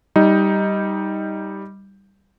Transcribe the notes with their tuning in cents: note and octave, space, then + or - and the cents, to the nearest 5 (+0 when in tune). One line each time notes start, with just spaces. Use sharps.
G3 +0 D#4 +10